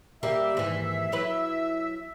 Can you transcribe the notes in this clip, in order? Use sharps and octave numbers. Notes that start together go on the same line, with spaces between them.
G3 A#3 E5
D#2 G#2 E3
F#3 E4 B4